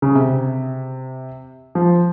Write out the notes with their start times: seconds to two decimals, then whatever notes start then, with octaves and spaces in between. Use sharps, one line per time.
0.02 C#3
0.15 C3
1.75 F3